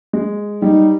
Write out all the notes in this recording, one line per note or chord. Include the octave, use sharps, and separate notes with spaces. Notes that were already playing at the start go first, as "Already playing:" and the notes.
G#3
G3 D#4